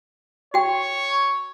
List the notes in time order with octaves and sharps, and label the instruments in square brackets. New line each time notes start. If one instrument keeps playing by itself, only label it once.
[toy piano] F#4 G5 [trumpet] C#5